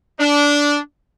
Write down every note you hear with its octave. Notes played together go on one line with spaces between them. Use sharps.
D4